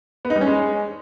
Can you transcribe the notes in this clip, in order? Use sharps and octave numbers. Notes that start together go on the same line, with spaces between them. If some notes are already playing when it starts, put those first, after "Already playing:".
B3
D#4
G3
C#4
G#3